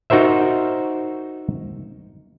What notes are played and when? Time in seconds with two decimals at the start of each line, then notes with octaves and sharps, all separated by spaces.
0.10 D#4 F#4 A#4 C5 E5